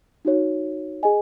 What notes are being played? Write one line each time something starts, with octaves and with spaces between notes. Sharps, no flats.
D#4 F#4 C#5
G#4 D#5 G#5